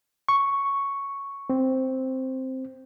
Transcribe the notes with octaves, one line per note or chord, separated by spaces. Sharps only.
C#6
C4